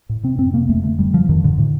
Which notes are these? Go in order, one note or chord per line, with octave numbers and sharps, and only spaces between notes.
A2
C3 C4
F2 C4
C3 A#3
F2 A3
D3 A3
F2 G3
D3 F3
F2 D#3
A2 D3
A2